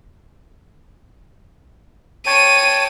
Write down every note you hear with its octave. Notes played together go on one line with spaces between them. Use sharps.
C#5 G5 A5 D#7